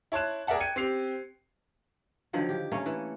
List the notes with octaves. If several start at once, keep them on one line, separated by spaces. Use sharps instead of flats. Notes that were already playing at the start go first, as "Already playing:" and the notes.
E4 C#5 A5 C6 F#6 E7
G#4 A#4 D5 E5 F#5 A5
G5 G#6 C#7 D#7
C4 G4 C7 F7
D3 D#3 F3 F#3
G4
A3 A#3 C#4
E3